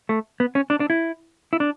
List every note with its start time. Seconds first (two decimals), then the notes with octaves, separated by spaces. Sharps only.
0.09 A3
0.40 B3
0.55 C#4
0.70 D4
0.80 D4
0.90 E4
1.53 E4
1.60 D4